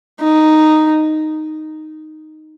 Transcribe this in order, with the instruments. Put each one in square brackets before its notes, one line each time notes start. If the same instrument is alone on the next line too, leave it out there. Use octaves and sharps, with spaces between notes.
[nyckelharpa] D#4